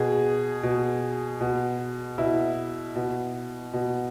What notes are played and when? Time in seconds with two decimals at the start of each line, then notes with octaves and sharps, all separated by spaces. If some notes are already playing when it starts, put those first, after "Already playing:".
Already playing: B2 G#4
0.63 B2
1.41 B2
2.18 B2 E4
2.96 B2
3.73 B2